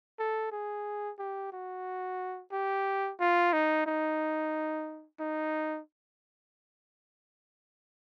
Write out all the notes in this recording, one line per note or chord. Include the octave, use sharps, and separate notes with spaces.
A4
G#4
G4
F#4
G4
F4
D#4
D#4
D#4